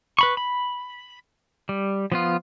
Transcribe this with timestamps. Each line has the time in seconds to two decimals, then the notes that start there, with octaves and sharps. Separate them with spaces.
0.19 B4 B5 C#6
0.37 B5
1.69 G3
2.12 F3 B3 F4